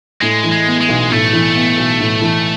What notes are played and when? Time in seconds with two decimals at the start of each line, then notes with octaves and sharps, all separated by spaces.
0.22 A2 G#3
0.44 E3
0.52 G#3
0.66 B3
0.81 G#3
0.89 B1
1.11 A2 A3
1.33 E3
1.56 B3
1.77 B1
2.00 A2
2.22 E3